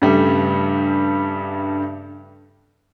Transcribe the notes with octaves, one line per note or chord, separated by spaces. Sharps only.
G2 C#3 G3 A3